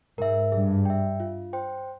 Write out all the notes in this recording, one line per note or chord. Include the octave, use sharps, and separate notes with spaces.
G#2 A#4 E5
G2 G#4
E5 G5
F4
C5 G5